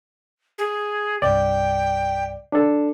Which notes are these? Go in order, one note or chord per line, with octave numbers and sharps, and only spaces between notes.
G#4
C2 G2 D5 G5
D4 A4